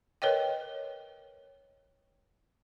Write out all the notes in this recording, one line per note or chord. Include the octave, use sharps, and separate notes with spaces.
A#4 B4 C#5 D#5 G5